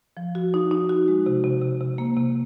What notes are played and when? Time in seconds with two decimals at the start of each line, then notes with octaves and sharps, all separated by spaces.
0.17 F3
0.35 F#4
0.54 D#4
0.71 D#4
0.89 F#4
1.08 G#3
1.26 C3
1.44 C3
1.62 C3
1.80 C3
1.98 A#3
2.16 C3